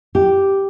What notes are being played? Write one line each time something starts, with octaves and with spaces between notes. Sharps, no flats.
G4